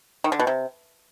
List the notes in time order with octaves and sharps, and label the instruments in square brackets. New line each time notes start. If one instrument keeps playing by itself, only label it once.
[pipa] D#3
D3
B2
C3